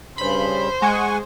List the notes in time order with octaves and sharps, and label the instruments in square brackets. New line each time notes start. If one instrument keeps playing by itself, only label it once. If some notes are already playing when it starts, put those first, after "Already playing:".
[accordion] G2 C#3 [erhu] C5 [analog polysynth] B5
[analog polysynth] G#3 [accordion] F#5 G#5 C#6